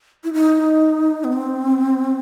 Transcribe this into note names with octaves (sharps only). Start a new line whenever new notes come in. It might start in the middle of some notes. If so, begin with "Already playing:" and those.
E4
D#4
B3
C4